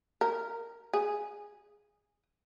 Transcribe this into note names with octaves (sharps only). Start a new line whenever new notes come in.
A#4
G#4